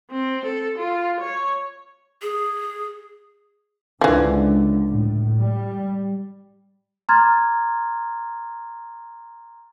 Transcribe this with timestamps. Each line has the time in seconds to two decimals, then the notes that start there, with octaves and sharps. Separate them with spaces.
0.11 C4
0.45 A4
0.78 F4
1.20 C#5
2.22 G#4
4.01 C#2 D3 E3 F3
4.88 A2
5.41 G3
7.09 A#5 C6 D6 F6 G#6 A6